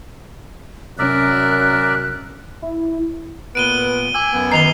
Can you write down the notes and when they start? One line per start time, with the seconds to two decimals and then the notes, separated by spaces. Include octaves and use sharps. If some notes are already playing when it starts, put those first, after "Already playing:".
0.99 F#2 C3 C#4 A#4 D5 E5 F#6
2.62 E4
3.55 A#2 B3 B4 D7 D#7 G7
4.14 G#5 D6 E6
4.33 F#2 B3
4.52 D#3 D#5 A#5 C7 F7 G7